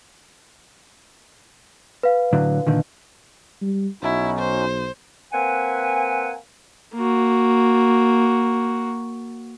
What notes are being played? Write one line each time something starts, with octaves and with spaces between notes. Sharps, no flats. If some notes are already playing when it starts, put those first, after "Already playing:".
B4 F5
A2 D3 F#3
A#2 D3 D#3
G3
B1 C#4 D#4 E4 F#4
C5
A#3 C4 B4 F#5 G#5
A#3 F#4